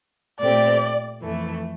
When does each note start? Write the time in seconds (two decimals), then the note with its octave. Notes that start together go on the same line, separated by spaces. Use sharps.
0.40 A#2 A3 C4 G4 D5
1.22 F2 E3 A3